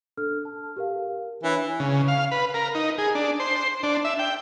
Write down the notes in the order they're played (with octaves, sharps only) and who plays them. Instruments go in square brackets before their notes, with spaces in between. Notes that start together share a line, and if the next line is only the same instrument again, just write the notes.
[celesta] D4 A4 F6
A5
G4 A#4 F5
[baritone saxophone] E3 [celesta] D4 C#5 G7
[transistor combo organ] C#3
F5
B4
A#4
D#4
G#4
D4
C5
D4
E5
G5